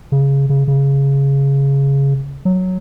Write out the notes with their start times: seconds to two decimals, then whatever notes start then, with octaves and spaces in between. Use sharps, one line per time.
0.12 C#3
0.49 C#3
0.67 C#3
2.45 F#3